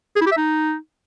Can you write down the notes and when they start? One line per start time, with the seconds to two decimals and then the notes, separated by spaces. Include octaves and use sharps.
0.16 G#4
0.21 E4
0.27 G4
0.32 E5
0.37 D#4